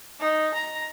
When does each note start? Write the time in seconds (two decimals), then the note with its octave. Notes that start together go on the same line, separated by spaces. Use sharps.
0.20 D#4
0.54 A#5